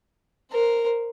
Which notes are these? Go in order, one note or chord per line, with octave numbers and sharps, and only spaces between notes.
A#4 C5